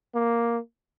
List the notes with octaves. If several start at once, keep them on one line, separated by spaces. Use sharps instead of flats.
A#3